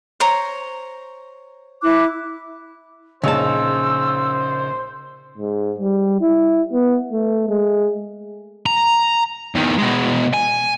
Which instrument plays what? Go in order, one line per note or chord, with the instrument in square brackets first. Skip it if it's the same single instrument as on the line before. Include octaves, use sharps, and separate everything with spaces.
[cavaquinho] C5 C#5 A#5
[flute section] E4 D6 F#6
[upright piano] A#1 D#4 C#5 [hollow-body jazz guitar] C#3 A5 [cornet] C5 [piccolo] E6
[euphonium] G#2
G3
E4
B3
A3
G#3
[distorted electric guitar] A#5
E2 D#3
B2 G#3
G#5